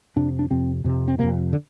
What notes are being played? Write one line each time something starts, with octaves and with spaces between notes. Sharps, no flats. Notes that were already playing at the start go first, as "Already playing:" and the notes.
F2 C3 D4
D4
F2 C3 C4
F2 C3
C4
F2 C3 A#3
D3